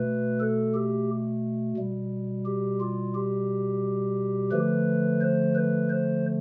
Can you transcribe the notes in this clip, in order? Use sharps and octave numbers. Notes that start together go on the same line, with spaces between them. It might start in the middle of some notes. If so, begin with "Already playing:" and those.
Already playing: B2 A3 B4
A4
G4
B2 G3
G4
F4
G4
D3 F3 A3 B4
C5
B4
C5